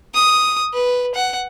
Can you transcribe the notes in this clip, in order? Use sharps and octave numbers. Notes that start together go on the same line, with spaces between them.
D#6
B4
F#5